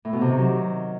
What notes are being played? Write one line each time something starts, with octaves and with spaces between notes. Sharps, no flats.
A2
B2
C3
D#3
F#3